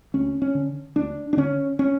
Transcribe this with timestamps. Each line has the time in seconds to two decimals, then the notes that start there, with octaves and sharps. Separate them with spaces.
0.14 D2 C#4
0.42 C#4
0.55 D3
0.96 D2 D4
1.33 D4
1.37 D3 C#4
1.79 C#4